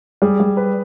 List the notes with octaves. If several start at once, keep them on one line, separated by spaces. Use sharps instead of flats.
G3 G#4
G3
B4